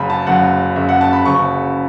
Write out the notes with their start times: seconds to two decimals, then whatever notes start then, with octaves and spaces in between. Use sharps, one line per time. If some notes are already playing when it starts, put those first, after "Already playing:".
Already playing: F#1 F#2 C#3 B5
0.10 A5
0.27 F#1 F#2 C#3 F#5
0.76 F#1 F#2 C#3 E5
0.89 F#5
1.01 A5
1.13 B5
1.25 F#1 F#2 C#3 C#6